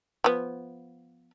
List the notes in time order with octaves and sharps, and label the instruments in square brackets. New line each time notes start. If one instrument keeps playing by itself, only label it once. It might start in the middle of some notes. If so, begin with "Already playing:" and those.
[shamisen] F3 B3